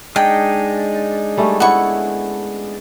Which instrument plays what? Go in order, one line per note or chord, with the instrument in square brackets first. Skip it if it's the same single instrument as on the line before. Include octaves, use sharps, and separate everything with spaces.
[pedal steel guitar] G#3 D4 D#4 [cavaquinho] G5
[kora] G3 A3 C#4
[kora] B3 C#4 E4 [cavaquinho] F#5 C#6